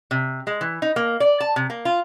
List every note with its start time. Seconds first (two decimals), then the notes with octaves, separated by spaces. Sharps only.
0.11 C3
0.47 G#3
0.61 E3
0.82 D#4
0.96 A#3
1.20 D5
1.40 A5
1.56 C3
1.70 A#3
1.85 F4